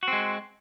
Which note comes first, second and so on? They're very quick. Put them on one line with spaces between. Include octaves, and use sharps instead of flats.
F#4 C4 G#3